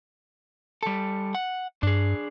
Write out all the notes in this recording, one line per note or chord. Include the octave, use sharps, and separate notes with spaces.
G3 A4
F#5
G2 D4 G#4